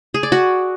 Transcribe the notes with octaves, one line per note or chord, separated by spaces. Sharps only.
G#4
D5
F#4